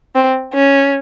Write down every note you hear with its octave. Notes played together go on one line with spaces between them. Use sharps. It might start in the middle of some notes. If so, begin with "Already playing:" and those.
C4
C#4